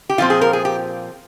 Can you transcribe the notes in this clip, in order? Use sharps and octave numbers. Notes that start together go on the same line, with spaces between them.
G4
A#2 F3 C4 F4
G#4
A#4
G#4
G4